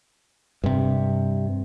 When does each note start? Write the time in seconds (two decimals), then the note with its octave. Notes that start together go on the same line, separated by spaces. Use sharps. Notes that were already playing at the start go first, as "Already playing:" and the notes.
0.64 G2 C3